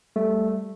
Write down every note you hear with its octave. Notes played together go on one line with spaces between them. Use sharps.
G3 A3